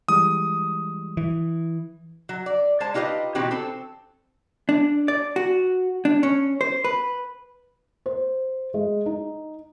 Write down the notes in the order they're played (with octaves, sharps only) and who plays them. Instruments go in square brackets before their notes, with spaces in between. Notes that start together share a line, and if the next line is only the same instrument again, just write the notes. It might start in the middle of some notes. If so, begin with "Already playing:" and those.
[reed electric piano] E3 G3 G#3 [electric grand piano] D#6
[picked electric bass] E3
[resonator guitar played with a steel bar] F#3
D5
G#3 C5 A5
D#4 F4 G4 B4 D#5
B2 E3 C4 D#4 F#4 G4
C4 A4
[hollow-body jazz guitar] D4
D5
F#4
D4
C#4
C5
B4
[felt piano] C5
G#3
D#4